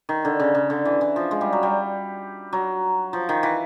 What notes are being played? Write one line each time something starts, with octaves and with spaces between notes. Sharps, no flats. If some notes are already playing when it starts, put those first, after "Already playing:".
D#3
D3
C#3
C#3
D3
E3
E3
F3
G#3
G3
F#3
G3
F#3
F3
D#3
E3